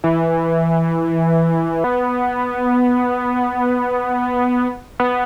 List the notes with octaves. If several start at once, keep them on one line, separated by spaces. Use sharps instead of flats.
E3
B3
B3